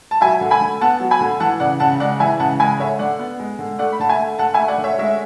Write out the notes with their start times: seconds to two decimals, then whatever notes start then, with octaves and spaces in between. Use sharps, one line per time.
0.11 A5
0.21 F#3 E5 G#5
0.41 D3
0.51 G#5 B5
0.61 D3
0.81 B3 F#5 A5
1.00 F#3
1.11 G#5 B5
1.21 D3
1.40 E3 F#5 A5
1.60 C#3 D5 F#5
1.80 C#3 F#5 A5
2.00 G#3 D5 F#5
2.20 E3 E5 G#5
2.39 C#3 F#5 A5
2.60 G#3 G#5 B5
2.79 D3 C#5 E5
2.99 D3 D5 F#5
3.19 B3
3.40 G#3
3.59 D3
3.79 A3 D5 F#5
3.92 B5
4.00 D3 A5
4.09 E5 G#5
4.19 A3
4.39 D3 F#5 A5
4.54 E5 G#5
4.59 A3
4.68 D5 F#5
4.78 D3
4.84 C#5 E5
4.98 G#3 C#5 E5